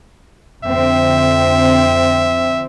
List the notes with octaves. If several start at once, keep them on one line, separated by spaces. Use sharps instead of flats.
F2 D3 C4 E5